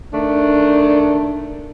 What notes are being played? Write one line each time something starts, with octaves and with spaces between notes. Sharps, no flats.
D#3 A3 D4